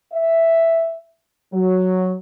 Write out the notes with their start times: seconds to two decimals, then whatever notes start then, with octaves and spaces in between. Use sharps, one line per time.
0.13 E5
1.53 F#3